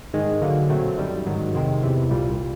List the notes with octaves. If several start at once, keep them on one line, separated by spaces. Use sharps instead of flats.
G#2 D#3 G#3
D3 F#3 A#3
A#2 F#3 A3 C4
F#2 D#3 G3
G#2 D#3 F#3
F2 C3 D#3 G#3 C4
E2 C3 E3
C2 A#2 G3